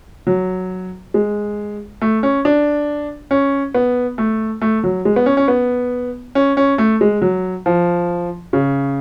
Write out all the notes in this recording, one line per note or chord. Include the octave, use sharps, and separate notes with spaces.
F#3
G#3
A3
C#4
D4
C#4
B3
A3
A3
F#3
G#3
B3
C#4
C#4
B3
C#4
C#4
A3
G#3
F#3
F3
C#3